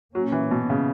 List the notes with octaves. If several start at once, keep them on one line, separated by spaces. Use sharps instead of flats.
A#2 F#3 A#3 C#4
E3
B2
C#3